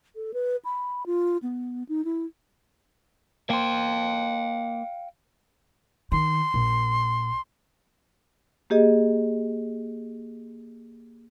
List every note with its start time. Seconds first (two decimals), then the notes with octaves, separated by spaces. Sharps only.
0.16 A4
0.34 B4
0.65 B5
1.06 F4
1.43 B3
1.89 D#4
2.05 E4
3.50 A#3 C5 F5 G5
6.12 D#3 C6
6.54 A#1
8.70 A#3 G4 G#4 D#5